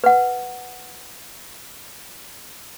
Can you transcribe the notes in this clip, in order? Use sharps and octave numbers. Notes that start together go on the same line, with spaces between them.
B4 F#5